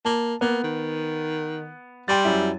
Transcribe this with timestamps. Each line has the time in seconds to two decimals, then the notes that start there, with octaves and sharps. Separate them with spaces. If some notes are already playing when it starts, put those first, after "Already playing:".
0.05 A#3 A5
0.41 A#3 B3
0.63 D#3
2.08 G3 G5 C6 A6
2.25 F#2 E4